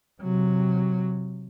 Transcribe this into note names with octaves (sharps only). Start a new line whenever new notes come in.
C3 F#3